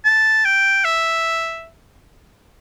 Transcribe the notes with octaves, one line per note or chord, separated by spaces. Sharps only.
A5
G5
E5